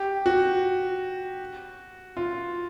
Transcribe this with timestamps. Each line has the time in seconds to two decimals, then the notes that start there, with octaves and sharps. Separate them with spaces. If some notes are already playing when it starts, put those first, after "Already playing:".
Already playing: G4
0.26 F#4
2.17 F4